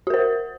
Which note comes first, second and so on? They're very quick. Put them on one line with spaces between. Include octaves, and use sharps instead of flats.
F#4 A#4 C5